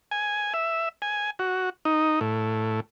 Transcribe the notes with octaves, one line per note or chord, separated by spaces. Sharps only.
G#5
E5
G#5
F#4
D#4
A2